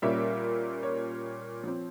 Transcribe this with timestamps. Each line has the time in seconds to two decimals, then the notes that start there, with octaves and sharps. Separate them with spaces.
0.02 A#2 G3 A#3 C#4 E5
0.83 C#5
1.63 F3 C4